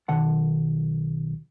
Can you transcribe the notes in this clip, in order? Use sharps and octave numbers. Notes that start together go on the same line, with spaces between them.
B1 D#3 F#5 A5